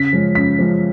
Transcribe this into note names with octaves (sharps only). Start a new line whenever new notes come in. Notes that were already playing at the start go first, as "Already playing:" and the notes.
Already playing: C#3 B6
F3 G#3 C#4
C#3 B6
F3 G#3 C#4